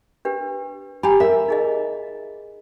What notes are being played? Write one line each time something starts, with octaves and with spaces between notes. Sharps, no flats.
D4 G4 B4
G4 G#5 A#5 B5
A#4 E5
D#4 G#4 D#5